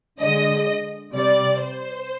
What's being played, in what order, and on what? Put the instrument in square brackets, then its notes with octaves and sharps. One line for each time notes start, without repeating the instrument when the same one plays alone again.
[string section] D3 G#3 D#5
C3 G3 D5
C5